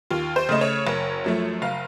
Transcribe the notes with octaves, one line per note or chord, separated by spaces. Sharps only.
D#2 F4
C5
C#3 A3 D#5
C#5
F#1
F#2 F3 A3
F#1 F5